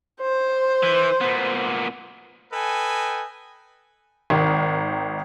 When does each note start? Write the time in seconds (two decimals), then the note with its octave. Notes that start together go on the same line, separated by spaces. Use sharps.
0.22 C5
0.83 E3
1.21 A#2 B3
2.52 A4 B4 D#5 G5 G#5
4.30 G#1 D#3